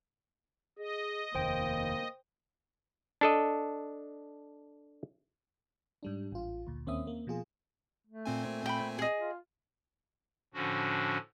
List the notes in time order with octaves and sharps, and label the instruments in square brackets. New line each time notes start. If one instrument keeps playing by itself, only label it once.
[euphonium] G#4 [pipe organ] D#5
[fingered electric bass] F1 D#2 [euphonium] A#3 [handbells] C5 G5
[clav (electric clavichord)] D4 A4 D#5
[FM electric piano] G#2 G3 D4
A1 F4
D2 A#2
D#2 A#3 C4 C#4 E5 D#6
A#3
B2 F3 F4 G#4
[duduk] A3
[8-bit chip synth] A#2 C4 G#5
[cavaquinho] G5 B5
G#4 D#5
[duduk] F4
[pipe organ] A2 D3 F3 C#4 D4 F#4